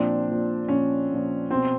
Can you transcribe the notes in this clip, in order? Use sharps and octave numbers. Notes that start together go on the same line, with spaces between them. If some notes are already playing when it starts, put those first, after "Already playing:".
Already playing: A#2 F3 C4 D4
A#2 F3
A#2 F3 C#4
A#2 F3
B2 C4